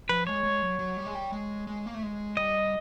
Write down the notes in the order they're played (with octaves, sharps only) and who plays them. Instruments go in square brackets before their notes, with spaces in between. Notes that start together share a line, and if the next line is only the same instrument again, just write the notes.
[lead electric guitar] F3 [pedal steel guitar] B4
[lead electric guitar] G#3 [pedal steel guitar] C#5
[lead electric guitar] G#3
F#3
F#3
G3
G#3
G3
G#3
G#3
A#3
A3
G#3
[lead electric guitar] G3 [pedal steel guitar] D#5